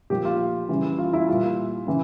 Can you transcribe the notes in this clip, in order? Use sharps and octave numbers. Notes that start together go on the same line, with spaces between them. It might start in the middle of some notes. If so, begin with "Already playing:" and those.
A#2 F3 G4
F4
C#3 E3 G3
F4
E4
A#2 G3 F4
C#3 E3